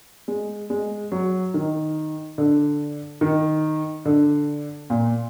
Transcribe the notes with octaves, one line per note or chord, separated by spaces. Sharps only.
G#3
G#3
F#3
D#3
D3
D#3
D3
A#2